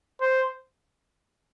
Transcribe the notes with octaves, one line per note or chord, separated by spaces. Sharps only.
C5